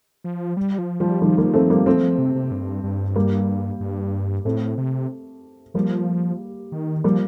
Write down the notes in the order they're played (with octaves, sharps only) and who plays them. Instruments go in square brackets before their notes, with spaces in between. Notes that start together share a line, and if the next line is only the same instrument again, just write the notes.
[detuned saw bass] F3
G3
F3
[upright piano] F3 [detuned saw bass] G3
[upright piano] D#3 G3 [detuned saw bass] F3
[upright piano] G3 A#3
A3 C4
G3 A#3
[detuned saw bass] F3 [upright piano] A3 C4
[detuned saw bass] F3
C3
C3
G2
G2
[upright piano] G3 A#3
[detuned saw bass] G2
[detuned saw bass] A2 [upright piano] A3 C4
[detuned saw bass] C3
[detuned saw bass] F3 [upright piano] G3 A#3
[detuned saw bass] D#3
[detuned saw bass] F3 [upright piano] G3 A#3